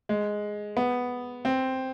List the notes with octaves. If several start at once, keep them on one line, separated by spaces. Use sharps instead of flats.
G#3
B3
C4